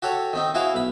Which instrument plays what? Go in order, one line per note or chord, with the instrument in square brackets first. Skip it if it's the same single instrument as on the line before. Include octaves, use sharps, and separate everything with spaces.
[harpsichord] F#4 G4 A4 C#5
D#3 C4 D#4
E4 F#4 G#4 C5 F5
B1 B5